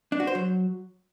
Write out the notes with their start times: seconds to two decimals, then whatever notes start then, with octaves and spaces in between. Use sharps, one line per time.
0.12 D4
0.20 F#4
0.27 C5
0.35 F#3